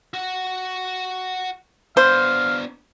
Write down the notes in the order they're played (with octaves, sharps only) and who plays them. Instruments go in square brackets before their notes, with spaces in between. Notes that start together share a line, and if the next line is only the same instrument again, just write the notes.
[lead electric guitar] F#4 F#5
[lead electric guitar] B3 D4 [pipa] C5 [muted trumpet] F5